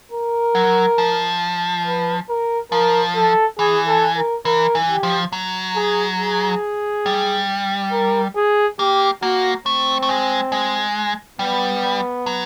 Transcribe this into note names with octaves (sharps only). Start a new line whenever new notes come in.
A#4
F#3
F3
B4
A#4
F3 A#4
A4
E3 G#4
A4
A#4
E3 A#4
E3
G4
F3
F#3
G#4
G#4
G3
A#4
G#4
A#3 G4
A#3 F#4
A3 C4
A3
G#3
G#3
G3 B3
F#3